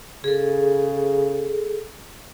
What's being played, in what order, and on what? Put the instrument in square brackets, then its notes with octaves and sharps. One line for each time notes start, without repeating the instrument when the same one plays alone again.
[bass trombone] C#3 [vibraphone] G#4 A4